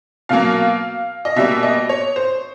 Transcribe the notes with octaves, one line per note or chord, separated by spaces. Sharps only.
B2 F#3 A#3 F5
D#5
B2 G3 A#3 E5
D#5
C#5
C5